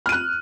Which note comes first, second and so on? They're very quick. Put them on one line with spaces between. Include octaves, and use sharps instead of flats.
F6 D#7 F#6